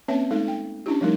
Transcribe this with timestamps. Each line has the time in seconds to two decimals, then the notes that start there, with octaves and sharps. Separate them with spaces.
0.08 A#3 C4 C#4 B4 C#5 E5
0.31 G#3 A3 D#4 A4
0.48 G5
0.86 C#4 D4 E4 G4
1.01 F3 G3 A3 D#4 A#4